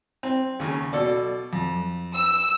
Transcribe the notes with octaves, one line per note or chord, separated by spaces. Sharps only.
C4
D#2 C#3
B2 A4 D5
F2
E6